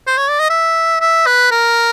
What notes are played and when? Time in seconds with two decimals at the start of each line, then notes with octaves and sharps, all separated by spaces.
0.07 C5
0.18 C#5
0.29 D5
0.40 D#5
0.50 E5
1.01 E5
1.26 B4
1.51 A#4